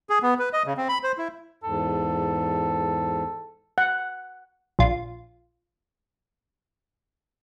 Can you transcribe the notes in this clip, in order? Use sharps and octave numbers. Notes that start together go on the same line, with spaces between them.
G#4
B3
B4
D#5
C#3
C4
B5
C5
E4
E2 G#2 A4
F#5
A#1 F4